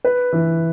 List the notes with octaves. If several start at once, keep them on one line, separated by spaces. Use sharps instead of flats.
B4
E3